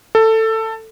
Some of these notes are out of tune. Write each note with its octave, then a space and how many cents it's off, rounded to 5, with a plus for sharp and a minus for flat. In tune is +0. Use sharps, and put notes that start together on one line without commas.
A4 +15